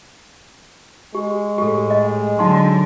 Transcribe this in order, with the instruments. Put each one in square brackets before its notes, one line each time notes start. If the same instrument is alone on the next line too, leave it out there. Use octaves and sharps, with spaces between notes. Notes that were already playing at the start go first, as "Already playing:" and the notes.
[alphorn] G#3 [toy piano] G4
[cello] A2 [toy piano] G4 A4
[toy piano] D#5
[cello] D3 F#3 [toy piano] D#4 F#5 C6